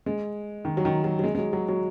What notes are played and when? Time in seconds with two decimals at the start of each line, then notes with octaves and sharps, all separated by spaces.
0.06 G#3
0.65 D#3
0.77 F#3
0.85 D#3
1.04 F#3
1.19 F#3
1.24 G#3
1.35 G#3
1.38 F#3
1.53 F#3
1.69 F#3